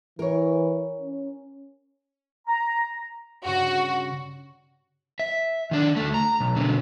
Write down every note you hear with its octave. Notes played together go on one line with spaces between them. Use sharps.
E3 A#4 C#5
C#4
A#5
G2 C#3 F#4
E5
D#3 D4
D2 A3
A#5
B1
B2 D3